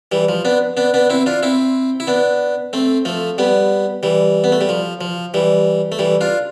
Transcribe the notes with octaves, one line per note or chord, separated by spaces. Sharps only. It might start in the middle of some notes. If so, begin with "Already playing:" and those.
E3 G3
F3
B3 D4
B3 D4
B3 D4
C4 E4
D4 F4
C4 E4
E4
B3 D4
A3 C4
F3 A3
G3 B3
E3 G3
B3
A3
G3
F3
F3
E3 G3
A3
E3 G3
D4 F4